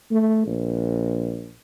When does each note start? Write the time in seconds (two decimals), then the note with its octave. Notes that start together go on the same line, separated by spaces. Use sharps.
0.11 A3
0.46 A#1